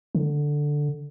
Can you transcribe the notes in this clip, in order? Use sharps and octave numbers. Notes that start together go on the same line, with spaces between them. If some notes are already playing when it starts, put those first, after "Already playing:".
D3